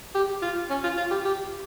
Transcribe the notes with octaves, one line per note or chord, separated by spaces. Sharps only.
G4
F4
C#4
F4
F4
G4
G4